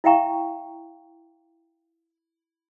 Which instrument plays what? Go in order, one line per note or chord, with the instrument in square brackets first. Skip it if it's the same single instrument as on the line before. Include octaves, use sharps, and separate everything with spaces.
[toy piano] E4 E5 F5 G5 A#5 C#6